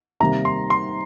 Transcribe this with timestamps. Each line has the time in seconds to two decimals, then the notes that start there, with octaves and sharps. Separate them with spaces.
0.20 C3 D#3 G3 A#3 A#5
0.45 C6
0.70 C6